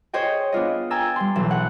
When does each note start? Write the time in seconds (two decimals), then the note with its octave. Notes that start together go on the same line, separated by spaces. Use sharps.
0.13 G#4 C5 C#5 D#5 G5
0.52 B3 D4 F4 D#5
0.90 G5 G#5 A#5 E6 A6
1.16 G3 C6
1.36 B1 E3 E7
1.51 F#5